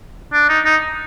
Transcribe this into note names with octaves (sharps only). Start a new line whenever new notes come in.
D4
D#4
D#4